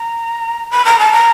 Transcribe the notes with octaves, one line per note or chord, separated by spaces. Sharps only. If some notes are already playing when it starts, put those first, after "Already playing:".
Already playing: A#5
B5
A#5
A5
A#5